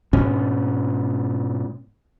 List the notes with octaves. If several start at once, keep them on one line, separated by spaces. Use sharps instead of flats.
G#2 B2 C#4